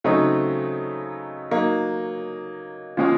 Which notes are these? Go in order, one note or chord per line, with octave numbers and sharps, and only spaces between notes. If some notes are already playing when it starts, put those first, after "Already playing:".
C#3 F#3 A3 C4 D#4
F#3 A#3 D#4
A#2 F3 G#3 C#4